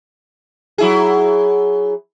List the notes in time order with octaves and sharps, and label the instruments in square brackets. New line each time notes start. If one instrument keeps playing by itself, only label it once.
[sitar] F#3 E4 G#4